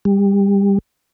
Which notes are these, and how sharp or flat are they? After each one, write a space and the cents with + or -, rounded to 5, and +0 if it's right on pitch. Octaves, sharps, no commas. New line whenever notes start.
G3 +25